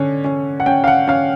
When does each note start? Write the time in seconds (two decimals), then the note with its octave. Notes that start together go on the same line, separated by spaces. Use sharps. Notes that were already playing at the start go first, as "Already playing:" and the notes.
Already playing: D3 C#4
0.24 C#4
0.60 F#5
0.66 C#4 G5
0.84 F5
0.88 F#5
1.08 C#4 F5